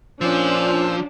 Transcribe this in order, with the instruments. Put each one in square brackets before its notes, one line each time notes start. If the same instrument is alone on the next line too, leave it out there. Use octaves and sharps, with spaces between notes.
[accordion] A#2 C5 E6 [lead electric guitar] F3 [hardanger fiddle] C#4 [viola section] D4